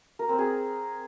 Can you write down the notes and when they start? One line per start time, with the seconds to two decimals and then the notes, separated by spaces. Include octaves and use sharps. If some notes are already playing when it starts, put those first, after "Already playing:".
0.19 A#4
0.29 C4
0.39 G#4